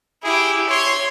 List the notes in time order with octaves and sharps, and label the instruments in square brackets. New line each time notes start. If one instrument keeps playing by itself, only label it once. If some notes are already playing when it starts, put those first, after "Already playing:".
[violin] E4 G4 [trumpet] G#4
[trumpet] C#5 [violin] C6 G#6